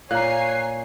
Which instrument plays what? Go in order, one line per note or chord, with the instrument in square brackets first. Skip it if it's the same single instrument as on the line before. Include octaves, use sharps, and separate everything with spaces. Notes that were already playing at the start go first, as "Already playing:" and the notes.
[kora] A#2 [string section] C#5 G#5 C7 [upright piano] A#5 F#6